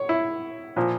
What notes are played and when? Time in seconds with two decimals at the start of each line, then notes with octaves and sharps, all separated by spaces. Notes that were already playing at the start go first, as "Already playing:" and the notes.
Already playing: C#5
0.09 E4
0.76 A#2 F3